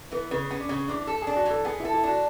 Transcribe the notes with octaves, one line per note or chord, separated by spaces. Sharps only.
E3 B3
C#3 B3
B3 C#4
D4
C#3 C#4
E3 D4
A4
D4 G#4
F#4
E3 A4
B3 G#4
E4 A4
E4
D4 F#4